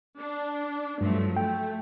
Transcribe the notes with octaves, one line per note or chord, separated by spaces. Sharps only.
D4
G2 F3 F#3 A3
A3 G5